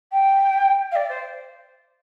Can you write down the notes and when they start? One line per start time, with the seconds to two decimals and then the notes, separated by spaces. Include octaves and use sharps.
0.12 G5
0.91 F5
0.95 D5
1.09 C5